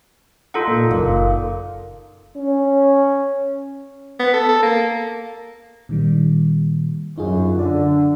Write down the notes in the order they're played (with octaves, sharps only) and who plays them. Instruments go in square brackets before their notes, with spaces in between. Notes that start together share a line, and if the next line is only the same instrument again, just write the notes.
[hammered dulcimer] D#4 [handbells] F4 A4 F#5
[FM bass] A#2
[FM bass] F#1 [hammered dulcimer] A#2
[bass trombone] C#4
[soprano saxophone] B3
A4
A4
A#3
[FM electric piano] A#2 D#3 G3
[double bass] F#2 [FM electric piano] D#4 F4 G#4
[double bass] D3 [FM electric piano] D5